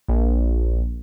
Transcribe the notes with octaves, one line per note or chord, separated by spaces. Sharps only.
A#1